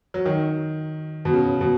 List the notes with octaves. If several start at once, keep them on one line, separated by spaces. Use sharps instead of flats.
F#3
D#3
B2
C#3
B2